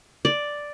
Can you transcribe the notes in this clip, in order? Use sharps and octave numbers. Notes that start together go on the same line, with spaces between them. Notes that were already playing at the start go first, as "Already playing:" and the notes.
D5